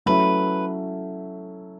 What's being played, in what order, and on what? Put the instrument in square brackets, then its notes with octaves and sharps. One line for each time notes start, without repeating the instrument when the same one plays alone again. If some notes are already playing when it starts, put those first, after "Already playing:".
[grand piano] F#3 A3 C#4 E4 [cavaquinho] B4